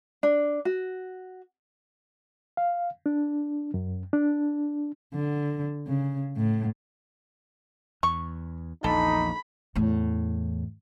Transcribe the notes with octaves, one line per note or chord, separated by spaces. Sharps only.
D4
F#4
F5
D4
F#2
D4
D3
C#3
A2
E2 C#6
A#1 E2 D#4 A4 B5
E2 A2